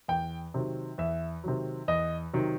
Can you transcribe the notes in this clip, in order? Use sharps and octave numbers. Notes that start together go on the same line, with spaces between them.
E2 G5
C3 D#3 F#3
E2 E5
C3 D#3 F#3
E2 D#5
C3 D#3 F#3